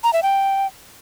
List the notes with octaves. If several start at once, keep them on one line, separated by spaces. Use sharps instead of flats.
A#5
E5
G5